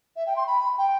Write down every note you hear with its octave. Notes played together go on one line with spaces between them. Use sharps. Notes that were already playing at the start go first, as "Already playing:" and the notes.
E5
G5
C6
B5
G5